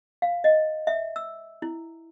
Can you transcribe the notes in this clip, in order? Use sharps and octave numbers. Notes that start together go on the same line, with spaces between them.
F5
D#5
E5
E6
E4